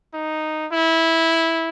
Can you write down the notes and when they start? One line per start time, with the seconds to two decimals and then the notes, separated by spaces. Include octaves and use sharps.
0.14 D#4
0.72 E4